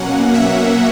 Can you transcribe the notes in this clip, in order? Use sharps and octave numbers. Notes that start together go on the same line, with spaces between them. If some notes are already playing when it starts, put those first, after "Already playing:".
Already playing: B2 F#3 A#3 C#4 F#5
E5